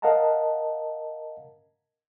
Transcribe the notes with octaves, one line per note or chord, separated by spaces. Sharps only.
A#4 D#5 F5 F#5 A5 A#5